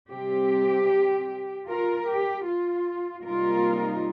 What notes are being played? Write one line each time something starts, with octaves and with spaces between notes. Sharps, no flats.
C3 G3 C4 G4
F4 A#4
G4
F4
C3 G3 A#3 D#4 F4 A#4